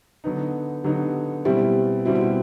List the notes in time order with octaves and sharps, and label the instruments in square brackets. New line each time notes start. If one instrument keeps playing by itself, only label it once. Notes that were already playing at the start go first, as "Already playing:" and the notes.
[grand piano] D3 F#3 B3 D#4
[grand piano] D3 F#3 B3 D#4 [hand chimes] G4
[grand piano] B2 G3 C4 E4 [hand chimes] G4
[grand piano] B2 G3 C4 E4 [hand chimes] F#4
[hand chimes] F#4
G4